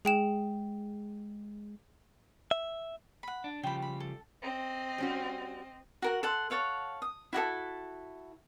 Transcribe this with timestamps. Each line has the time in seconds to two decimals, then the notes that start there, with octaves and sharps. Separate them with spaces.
0.05 G#3 G#4 G5 E7
2.51 E5
3.23 F#5 B5
3.44 D4
3.63 C#3 F3 G3 G5 B5
3.82 B5
4.00 A4
4.43 C4 D#5
4.98 G3 C#4 F#4
6.02 F#4 A#4 F#5
6.23 A4 F#5 C6
6.50 A4 C#5 F5 F#5
7.02 D#6
7.33 E4 F#4 G4 A4